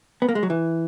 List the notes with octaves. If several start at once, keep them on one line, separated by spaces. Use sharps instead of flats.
B3
A#3
G#3
F#3
E3